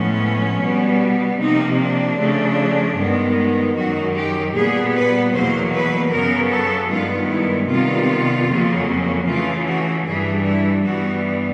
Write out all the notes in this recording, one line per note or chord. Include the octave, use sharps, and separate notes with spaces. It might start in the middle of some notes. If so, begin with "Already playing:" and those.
Already playing: A2 F3 G#3 B3 C#4
B2 G3 B3
C3 F3 A#3 D#4
D4
C#3 F3 A3
G2 D#3 G#3 B3
F#2 D#3 F#3 F#4
G4
A#2 G3 B3 G#4
B4
E2 B2 F#3 A#3 C5
B4
F#2 C#3 F#3 B3 A#4
A4
G2 D#3 G#3 B3 F4
E4
C3 D#3 G3 B3 F4
F2 C#3 F#3 A#3
C#3 E3 A3 F4
F#4
G2 E3 G3 G#4
E4
G2 E3 G3 B3 F#4